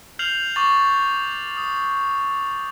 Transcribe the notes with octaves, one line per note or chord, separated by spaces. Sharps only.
F6 G6 C7 F7 F#7
C#6 D6 A6 F#7
D#6